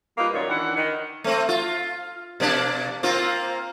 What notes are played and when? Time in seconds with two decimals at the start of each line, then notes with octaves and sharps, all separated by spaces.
0.18 G3 A#3 D#4 F4 B4
0.34 F#2 A#2 D#3 C#5 D5
0.48 D#3 E3 D4 F#5
0.76 D#3
1.24 A3 C4
1.49 F4
2.40 B2 A#3 D4
3.03 A#3 C4 F4